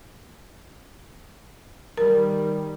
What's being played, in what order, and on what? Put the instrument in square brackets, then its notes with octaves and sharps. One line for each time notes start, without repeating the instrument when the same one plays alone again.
[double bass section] D#3 G3 [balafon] A#4